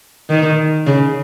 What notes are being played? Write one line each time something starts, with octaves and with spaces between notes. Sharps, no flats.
D#3
C#3